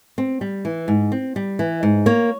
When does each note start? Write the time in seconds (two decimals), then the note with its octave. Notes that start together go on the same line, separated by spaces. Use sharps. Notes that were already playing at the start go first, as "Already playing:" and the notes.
0.18 C4
0.41 G3
0.65 E3
0.88 G#2
1.12 C4
1.36 G3
1.59 E3
1.83 G#2
2.06 A#3 C#5